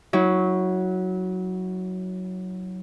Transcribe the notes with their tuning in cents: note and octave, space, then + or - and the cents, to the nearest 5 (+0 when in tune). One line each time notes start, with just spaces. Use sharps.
F#3 +0 E4 -40